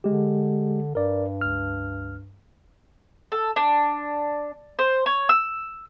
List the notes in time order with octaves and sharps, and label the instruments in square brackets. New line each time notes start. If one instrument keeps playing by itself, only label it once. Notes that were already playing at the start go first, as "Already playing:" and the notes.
[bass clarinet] D3 [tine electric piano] G#3 G4
[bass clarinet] G2 [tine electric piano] A#4 D5
[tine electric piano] C#2 F6
[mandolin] A4
D4
C5
C#5
E6